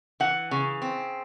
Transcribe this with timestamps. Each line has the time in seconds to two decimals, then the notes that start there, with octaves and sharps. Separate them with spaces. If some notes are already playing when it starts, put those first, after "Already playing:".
0.20 E3 F#5
0.51 C#3
0.82 C4